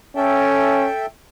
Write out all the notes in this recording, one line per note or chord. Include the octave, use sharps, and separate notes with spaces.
C#4 A4 E5 G5